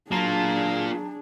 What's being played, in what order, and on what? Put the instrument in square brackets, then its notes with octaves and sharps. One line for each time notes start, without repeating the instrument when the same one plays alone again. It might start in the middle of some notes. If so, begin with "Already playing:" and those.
[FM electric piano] F#3 A5 A#5 [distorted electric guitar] A#3 F4 [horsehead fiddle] D4 G#4